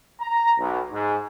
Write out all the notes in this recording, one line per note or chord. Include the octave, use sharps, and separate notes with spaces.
A#5
B1
G#2